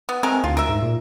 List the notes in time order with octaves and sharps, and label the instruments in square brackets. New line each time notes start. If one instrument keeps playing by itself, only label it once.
[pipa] B3
[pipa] G#3 A3 A#4 [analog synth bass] C4
[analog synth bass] D2 [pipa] F4
[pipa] A#4 E5
[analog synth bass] G#2
A#2